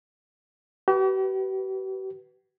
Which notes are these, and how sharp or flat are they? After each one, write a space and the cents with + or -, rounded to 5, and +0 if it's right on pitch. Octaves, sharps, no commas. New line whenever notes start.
G4 -45 B4 -5